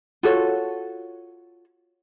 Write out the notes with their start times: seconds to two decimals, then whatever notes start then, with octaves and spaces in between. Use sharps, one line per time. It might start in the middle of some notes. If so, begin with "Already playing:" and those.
0.23 F4 F#4 A4 C#5